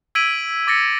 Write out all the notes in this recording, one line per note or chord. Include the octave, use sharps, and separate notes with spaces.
E6 G#6 B6 D7 D#7 F#7
D6 A6 A#6 C#7